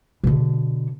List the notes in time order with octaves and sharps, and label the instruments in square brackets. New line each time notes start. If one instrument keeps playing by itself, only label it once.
[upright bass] B2 D3